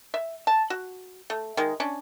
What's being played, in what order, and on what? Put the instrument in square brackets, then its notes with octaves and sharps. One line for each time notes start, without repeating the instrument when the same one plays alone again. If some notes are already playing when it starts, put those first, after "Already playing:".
[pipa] E5
A5
F#4
A3
D#3 G#3
C#4 D4